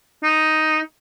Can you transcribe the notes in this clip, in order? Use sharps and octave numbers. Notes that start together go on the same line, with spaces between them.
D#4